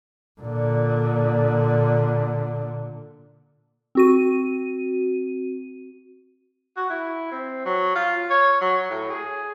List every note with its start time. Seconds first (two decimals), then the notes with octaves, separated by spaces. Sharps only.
0.41 A#2 D3
3.95 C4 F#4 D#7
6.77 F#4
6.90 E4
7.31 C4
7.65 F#3
7.95 F4
8.30 C#5
8.61 F#3
8.90 A2
9.10 G#4